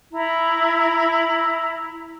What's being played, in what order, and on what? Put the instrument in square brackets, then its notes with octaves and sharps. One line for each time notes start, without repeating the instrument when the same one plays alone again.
[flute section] E4 A#5